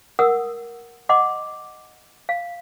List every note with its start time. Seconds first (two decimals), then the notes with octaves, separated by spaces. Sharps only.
0.19 A#4 F#5 D#6 E6
1.09 D#5 F#5 C6 D6
2.29 F5